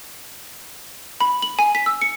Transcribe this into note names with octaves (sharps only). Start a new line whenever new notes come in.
B5
F#7
G#5
B6
E6
C#7